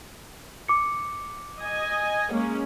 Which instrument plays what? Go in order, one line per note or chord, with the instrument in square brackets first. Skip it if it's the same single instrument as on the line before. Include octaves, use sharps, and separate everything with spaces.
[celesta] D6 C#7
[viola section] D#5 G#5
G#3 A#3 C#4